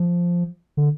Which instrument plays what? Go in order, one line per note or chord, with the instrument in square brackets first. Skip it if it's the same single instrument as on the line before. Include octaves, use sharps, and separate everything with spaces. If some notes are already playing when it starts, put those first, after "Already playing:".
Already playing: [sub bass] F3
D3